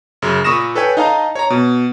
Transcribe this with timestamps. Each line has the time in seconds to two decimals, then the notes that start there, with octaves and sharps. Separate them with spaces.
0.22 F#2 C#3
0.44 A#2 B5 C#6 D#6 A#6 E7
0.75 A4 B4 C#5 G5 G#5
0.97 D#4 D#5 F5 A5 A#5
1.35 C#5 A#5
1.50 B2